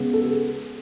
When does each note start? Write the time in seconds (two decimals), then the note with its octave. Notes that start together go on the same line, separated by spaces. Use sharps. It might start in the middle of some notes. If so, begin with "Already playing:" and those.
Already playing: C#3 G#3 B3
0.13 A4
0.23 G#4